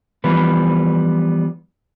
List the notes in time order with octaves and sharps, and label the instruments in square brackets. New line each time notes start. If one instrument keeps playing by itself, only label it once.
[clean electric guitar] E3 F3 G3 B3 B4